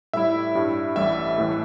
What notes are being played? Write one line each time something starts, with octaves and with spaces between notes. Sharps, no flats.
A2 G3 E4 E5
G2 G3 E4
A1 A2 G3 E5
A2 E3 A3